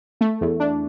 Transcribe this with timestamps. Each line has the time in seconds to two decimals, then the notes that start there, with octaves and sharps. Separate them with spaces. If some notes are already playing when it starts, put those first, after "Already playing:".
0.21 A3
0.41 E2
0.60 D4